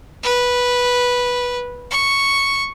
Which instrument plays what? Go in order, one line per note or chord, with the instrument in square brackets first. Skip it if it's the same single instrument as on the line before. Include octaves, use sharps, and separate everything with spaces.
[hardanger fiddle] B4
C#6